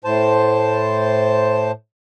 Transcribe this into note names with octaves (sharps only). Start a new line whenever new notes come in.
A2 C5 A5